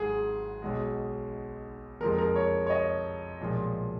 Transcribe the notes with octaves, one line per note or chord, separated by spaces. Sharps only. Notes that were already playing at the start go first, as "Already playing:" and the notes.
Already playing: G#1 G#2 F#3 G#4
B1 B2 G#3
F#1 F2 F3 G#3 A#4
A#4
C#5
C#5
D#5
B1 A#2 F3 G#3